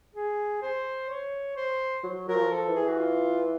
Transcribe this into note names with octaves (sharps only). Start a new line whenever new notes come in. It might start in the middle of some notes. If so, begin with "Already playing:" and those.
G#4
C5
C#5
C5
F#3
F#3 A#4
F3
A4
E3
G#4
F#4
F4